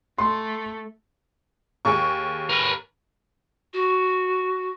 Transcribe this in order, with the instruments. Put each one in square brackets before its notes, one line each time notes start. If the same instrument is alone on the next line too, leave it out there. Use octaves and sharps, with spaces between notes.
[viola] A3 [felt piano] C6
[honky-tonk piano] D#2 G#4 C#6
[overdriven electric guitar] A#4 B4
[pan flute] F#4